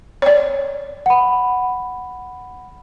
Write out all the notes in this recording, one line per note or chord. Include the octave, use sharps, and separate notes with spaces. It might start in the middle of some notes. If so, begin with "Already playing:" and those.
C#5 D5
F#5 B5